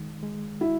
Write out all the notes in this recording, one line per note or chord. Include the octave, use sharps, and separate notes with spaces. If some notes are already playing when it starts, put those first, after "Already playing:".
Already playing: D#3 G#3
G#3
E4 F#4